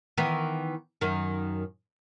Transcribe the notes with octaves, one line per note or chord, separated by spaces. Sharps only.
D#3 E3 B3
F#2 D#3